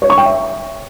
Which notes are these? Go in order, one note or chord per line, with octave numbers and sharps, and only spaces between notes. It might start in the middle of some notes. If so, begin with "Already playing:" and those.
C#5
C#6
G5
E5